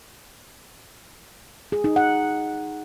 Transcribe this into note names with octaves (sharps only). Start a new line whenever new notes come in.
G#4
D#4
F#5